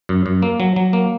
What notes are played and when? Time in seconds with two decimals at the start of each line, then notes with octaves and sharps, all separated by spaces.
0.09 F#2
0.26 F#2
0.42 A#3
0.60 F#3
0.76 F#3
0.93 A#3